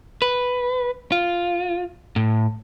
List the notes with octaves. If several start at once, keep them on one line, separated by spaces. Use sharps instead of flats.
B4
F4
A2